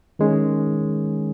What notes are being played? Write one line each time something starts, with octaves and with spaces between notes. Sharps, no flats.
D#3 G#3 C#4